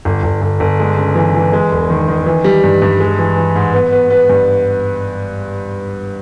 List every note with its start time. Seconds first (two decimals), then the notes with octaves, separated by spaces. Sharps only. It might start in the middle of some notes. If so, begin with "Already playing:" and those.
0.05 G1
0.23 G1
0.42 G1
0.60 G1
0.80 G#3
0.97 C#3
1.15 E3
1.34 E3
1.53 G#3
1.71 E1
1.90 D#3
2.09 D#3
2.26 E3
2.45 G3
2.64 G2
2.82 G2
3.00 G#3
3.19 E3
3.36 E3
3.56 G#2
3.73 B3
3.92 B3
4.10 B3
4.30 G2